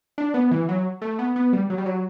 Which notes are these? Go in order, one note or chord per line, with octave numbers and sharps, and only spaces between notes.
D4
B3
E3
F#3
A3
B3
B3
G3
F#3
G3
F#3